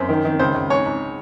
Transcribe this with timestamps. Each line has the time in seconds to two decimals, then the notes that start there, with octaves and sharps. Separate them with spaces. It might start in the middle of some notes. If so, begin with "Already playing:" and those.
Already playing: F#2 C5
0.09 D#3
0.25 D#3
0.39 C#2 C5
0.55 C#2
0.70 G#2 C#5
0.86 G#2